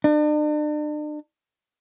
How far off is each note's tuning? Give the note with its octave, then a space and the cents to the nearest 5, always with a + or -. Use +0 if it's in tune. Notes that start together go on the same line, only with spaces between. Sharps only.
D4 +40